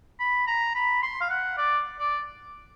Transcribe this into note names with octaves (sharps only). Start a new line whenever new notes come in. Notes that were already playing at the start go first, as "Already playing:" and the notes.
B5
A#5
B5
C6
F5
F#5
D5
D5